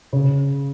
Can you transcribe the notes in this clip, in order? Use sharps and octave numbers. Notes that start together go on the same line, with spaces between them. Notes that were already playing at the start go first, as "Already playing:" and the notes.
C#3